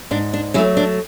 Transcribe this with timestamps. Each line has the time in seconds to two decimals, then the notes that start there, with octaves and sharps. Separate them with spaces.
0.11 G#2 D4
0.33 D4
0.54 F#3 C#4 E4
0.58 A3
0.77 D4